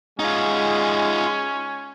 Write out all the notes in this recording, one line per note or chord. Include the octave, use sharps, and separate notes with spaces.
G#3 C#4 D#4 F4